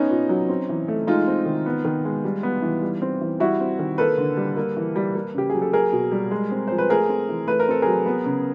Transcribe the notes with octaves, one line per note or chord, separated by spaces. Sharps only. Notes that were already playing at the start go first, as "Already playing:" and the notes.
Already playing: B3 C#4 D#4
A#2
F#3
C4
E3
A3
G#3 D#4 F4
C4
D#3
B3
D#3
G#3
G3
B3
E3
G3
C4
E3
G3 E4 F#4
C4
D#3
A#3 A4 B4
D3
G3
A#3
E3
G3
A#3
C#3 G4
F#3 G#4
A4
A#3 G#4 A#4
B2
G3
G#3
C4
F3 C5
B4
A3 G#4 A#4
C4
E3
A3 B4
A#4
C4 A4
F#3 G#4 A#4
B3
C#3